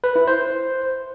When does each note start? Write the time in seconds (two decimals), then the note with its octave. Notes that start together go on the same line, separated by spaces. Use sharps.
0.04 B4
0.16 E4
0.28 C5